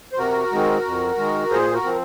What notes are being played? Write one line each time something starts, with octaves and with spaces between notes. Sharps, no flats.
C5
C3 F#4 A#4
D#3 G#3 C4
F2
D#3 G#3
A#2 G#4 C5
F#4 A#4
F3 C4